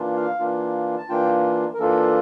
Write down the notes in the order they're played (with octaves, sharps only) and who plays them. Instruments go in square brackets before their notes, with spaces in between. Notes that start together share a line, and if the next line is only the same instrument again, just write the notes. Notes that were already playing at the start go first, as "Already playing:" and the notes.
Already playing: [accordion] E3 A#3 D4 F4
F5
E3 A#3 D4 F4
A5
E3 A#3 D4 F4 G5
A#4
E3 A#3 D4 F4 A4